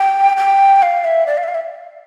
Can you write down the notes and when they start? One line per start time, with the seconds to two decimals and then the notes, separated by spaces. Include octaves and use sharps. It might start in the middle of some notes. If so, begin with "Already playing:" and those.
Already playing: G5
0.37 G5
0.82 F5
1.04 E5
1.27 D5
1.37 F5
1.43 E5
1.48 F5
1.55 E5